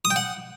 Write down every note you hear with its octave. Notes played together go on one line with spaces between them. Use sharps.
D#6
G5
F#5